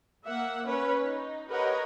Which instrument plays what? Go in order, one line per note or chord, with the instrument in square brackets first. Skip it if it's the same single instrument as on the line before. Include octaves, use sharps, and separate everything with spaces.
[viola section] A#3 E5 F#5
C#4 B4 C#5
D#4
G4 A#4 B4 C#5 D#5 F#5